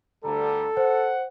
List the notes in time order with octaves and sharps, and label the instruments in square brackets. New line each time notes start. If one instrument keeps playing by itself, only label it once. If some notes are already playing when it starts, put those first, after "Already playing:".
[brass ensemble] D2 D3 G3 [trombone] A4 [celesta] A#5
[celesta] C5 [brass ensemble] F#5